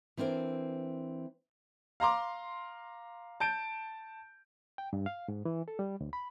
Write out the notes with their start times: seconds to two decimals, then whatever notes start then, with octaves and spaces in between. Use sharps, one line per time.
0.17 E3 C4 D4 A#4 C5
2.00 F5 A#5 C6 D6
3.40 A5 G6 D7
4.78 G5
4.93 G2
5.06 F5
5.28 G#2
5.45 E3
5.68 A4
5.79 G3
6.01 D2
6.13 B5